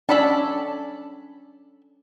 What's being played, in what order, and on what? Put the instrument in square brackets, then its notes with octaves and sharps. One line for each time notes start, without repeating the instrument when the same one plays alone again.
[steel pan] C#4 D4 B5 [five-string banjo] A4 D5 A5